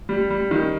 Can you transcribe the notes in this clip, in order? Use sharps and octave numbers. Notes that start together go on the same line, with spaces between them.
G3
G3
D#3